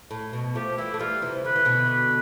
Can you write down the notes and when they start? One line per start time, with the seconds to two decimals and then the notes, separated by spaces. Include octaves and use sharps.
0.11 A2
0.33 B2
0.55 F3 A3 G4
0.78 E3 G3 E4
0.94 A3
1.00 E3 G3 F4
1.22 C3 E3
1.45 D3 B4
1.56 E3
1.65 B2 D3
1.89 B4